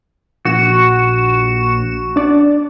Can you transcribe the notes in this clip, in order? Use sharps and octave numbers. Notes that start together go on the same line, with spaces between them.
A#1 F#4 E7
D4 D5